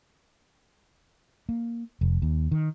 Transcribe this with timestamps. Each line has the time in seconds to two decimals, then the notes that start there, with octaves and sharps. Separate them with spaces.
1.49 A#3
2.01 F1
2.22 D#2
2.52 D#3